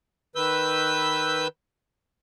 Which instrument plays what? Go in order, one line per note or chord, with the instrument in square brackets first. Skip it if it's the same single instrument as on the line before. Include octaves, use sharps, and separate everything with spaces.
[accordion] D#3 B4 E6 G6